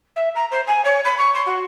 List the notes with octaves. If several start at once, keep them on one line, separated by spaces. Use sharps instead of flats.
E5
A#5
C5
G#5
C#5
B5
C#6
C6
F#4